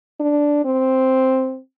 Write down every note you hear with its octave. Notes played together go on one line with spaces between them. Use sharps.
D4
C4